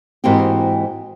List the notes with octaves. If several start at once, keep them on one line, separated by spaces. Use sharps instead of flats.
G#2 E3 A#3 C4 F#4 G4